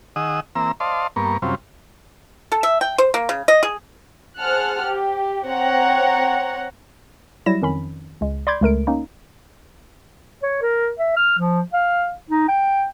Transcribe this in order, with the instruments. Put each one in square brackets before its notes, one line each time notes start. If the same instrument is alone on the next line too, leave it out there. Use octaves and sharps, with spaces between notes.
[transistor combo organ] D#3 G#4 D#5 F#5 D#6 E6
E3 A#3 C4 A#5 E6
C5 D5 D#5 F5 A5 C6
G2 A#3 B3 A#4 C#6
F#2 C3 G3 C4 C#4 F4
[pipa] A4
E5
G5
C5
A#3
C#3
D#5
G#4
[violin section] G#4 C5 F#5 A5 F6 F#6
G4
C4 C#5 F#5 G5 A#5
[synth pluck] F#3 G3 E4 A#6 E7
F2 D#3 C#4 B5
C#2 G#3
D5 B5 C6 D6 G6 G#6
C#2 A3 A#4 D7
A#3 C#4 D#4
[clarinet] C#5
A#4
E5
F6
F3
F5
D#4
G5